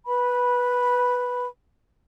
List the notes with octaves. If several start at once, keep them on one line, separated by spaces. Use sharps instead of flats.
B4 B5